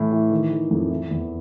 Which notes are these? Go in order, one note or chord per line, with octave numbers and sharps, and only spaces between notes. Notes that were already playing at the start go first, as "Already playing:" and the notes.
Already playing: A2 E3
E3
D#3
D#3
F2
E3
E2